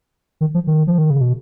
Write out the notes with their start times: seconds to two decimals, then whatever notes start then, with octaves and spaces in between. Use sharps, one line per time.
0.41 D#3
0.54 F3
0.67 D#3
0.87 F3
0.98 D#3
1.10 C#3
1.21 B2